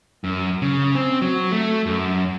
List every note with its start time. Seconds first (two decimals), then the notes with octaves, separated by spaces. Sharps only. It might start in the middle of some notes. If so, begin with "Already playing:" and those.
0.24 F#2
0.62 C#3
0.95 C4
1.22 F#3
1.52 A3
1.86 F#2